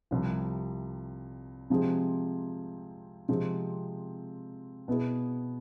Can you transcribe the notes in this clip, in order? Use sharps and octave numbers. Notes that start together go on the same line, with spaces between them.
C2 C3 F3
C3 F3 G#3 C4 G#4
C3 F3 G#3 C4
B2 B3 E4 G#4